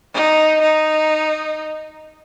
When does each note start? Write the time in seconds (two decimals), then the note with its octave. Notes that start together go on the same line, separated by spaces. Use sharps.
0.14 D#4
0.62 D#4